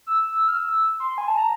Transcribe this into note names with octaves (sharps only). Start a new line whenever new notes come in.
E6
F6
E6
C6
G#5
A5
A#5